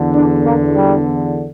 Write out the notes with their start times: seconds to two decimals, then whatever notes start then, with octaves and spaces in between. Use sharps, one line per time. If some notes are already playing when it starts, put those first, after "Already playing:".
Already playing: E2 D3
0.15 D4
0.45 A#3
0.76 G3